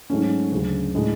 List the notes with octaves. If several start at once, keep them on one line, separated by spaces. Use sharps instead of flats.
G#2 F#3 A3 C#4
D2 C#3 F#3
A2 G#3 D4